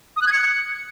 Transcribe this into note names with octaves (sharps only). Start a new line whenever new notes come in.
D#6
F#6
G#6
C#7